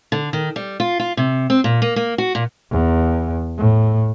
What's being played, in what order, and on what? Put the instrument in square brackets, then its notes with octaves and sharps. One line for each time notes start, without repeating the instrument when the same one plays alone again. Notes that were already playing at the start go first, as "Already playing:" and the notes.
[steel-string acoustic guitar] D3
D#3
G3
F4
F4
C3
C4
A#2
A#3
A#3
F#4
A#2
[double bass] E2
A2